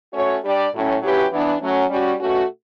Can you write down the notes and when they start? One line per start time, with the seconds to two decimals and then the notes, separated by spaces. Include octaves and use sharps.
0.13 A3 C#4 F#4 C#5
0.43 G3 D4 G4 D5
0.73 A2 F#3 C#4
1.02 F#3 C#4 E4 G4 B4
1.31 E3 B3 D4
1.61 F#3 A3 C#4
1.90 G3 C#4 F#4
2.20 B2 A3 C#4 F#4